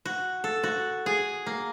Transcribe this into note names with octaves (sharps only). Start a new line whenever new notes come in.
F#4
A4
F#4
G#4
A#3